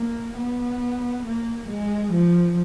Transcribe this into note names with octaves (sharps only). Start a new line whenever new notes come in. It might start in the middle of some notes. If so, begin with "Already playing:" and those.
Already playing: A#3
B3
A#3
G#3
F3